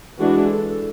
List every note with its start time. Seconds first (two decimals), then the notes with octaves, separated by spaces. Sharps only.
0.19 E3 G#3 D4 F#4
0.51 A4